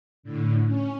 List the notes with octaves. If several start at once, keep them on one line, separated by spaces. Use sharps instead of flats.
A2 D3
C#4